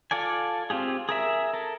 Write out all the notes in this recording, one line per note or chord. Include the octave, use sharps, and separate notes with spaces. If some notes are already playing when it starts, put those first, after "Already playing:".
F4 A4 D5 G#5
C4 F4 G4 G#4
G#4 A#4 E5
A4 A#4